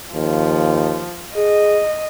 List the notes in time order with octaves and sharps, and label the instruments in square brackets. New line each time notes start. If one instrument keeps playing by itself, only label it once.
[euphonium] D#2 [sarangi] F3
[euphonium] G#4 [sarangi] D#5